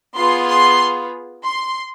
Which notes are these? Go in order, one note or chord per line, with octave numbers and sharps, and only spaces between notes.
B3 F4 G#4 C6
C6
C6